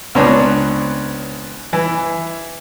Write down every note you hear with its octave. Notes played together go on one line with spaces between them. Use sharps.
C#2 B3 C4 D4 C#5 A#5
E3